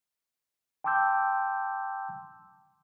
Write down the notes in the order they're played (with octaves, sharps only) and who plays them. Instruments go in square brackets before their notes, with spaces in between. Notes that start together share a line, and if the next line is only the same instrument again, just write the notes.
[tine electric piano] G5 A5 C6 D6 E6 G6